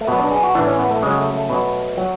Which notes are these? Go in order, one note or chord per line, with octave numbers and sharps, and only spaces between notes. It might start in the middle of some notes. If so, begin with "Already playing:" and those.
A3
B2 F#3 B3
D4
G#4
F#4
A2 E3 D4
C#4
B3
A3
C#3 F#3 G#3
A3
A3
B2 F#3
F#3